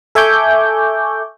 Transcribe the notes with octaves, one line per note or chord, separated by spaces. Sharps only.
A4 E5 G#5 C#6 D6 G6